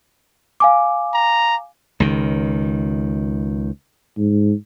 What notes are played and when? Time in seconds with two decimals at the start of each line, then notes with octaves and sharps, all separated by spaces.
0.60 F5 G#5 D6
1.14 A#5
2.00 C#2 D#3
4.17 G#2